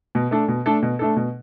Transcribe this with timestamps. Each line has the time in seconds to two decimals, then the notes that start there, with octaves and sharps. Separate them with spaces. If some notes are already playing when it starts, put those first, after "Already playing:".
0.15 B2
0.31 A3 D4 A4
0.48 B2
0.66 A3 D4 A4
0.82 B2
0.99 A3 D4 A4
1.16 B2